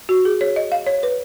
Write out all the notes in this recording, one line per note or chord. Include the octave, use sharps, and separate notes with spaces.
F#4
G#4
C#5
D#5
F5
C#5
B4